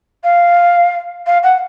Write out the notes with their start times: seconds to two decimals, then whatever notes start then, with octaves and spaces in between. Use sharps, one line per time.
0.24 F5
1.26 F5
1.43 F#5